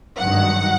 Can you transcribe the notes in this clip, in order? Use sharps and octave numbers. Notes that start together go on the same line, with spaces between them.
G#1 G2 D#3 F#3 F#5